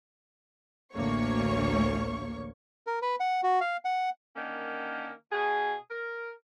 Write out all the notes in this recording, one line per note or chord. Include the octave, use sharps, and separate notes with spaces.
A1 D2 A#3 C#5 C#6
A#4
B4
F#5
F#4
F5
F#5
D3 D#3 A#3 C#4
B2 G#4
A#4